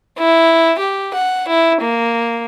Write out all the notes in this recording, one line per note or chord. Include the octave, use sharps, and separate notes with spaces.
E4
G4
F#5
E4
A#3